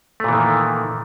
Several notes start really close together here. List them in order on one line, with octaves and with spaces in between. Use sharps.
A3 A#2 E3 D#3